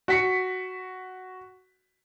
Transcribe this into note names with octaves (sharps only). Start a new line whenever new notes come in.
F#4 B6 C#7